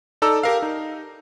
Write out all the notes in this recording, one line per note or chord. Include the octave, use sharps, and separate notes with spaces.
D#4 A4 D5 A#5 E6
G4 A#4 F5
D#4